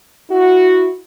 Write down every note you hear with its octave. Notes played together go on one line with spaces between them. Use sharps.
E4 F#4